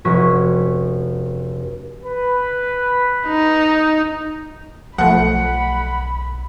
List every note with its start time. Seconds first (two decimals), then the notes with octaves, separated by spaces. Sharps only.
0.05 F1 C#4 F#4 C#6 B6
2.04 B4
3.26 D#4
4.98 B1 F3 A3 F#5 B5